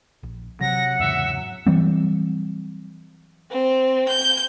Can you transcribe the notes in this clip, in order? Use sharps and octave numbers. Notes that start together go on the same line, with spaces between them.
A#1
C3 F#3 F#5 A#6
E2 G#2 C#3 E5
E3 F#3 G3 C4
C4
G6